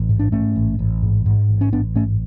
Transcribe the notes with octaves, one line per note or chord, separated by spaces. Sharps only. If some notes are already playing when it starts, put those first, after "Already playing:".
Already playing: A1
G#2
D4
G#2 A3 C#4
A1
A1
G#2
G#2
A1
C#4
A1 B3 D4
G#2 A3 C#4